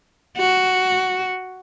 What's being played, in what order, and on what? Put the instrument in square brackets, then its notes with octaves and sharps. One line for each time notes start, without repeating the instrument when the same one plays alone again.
[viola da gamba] F#4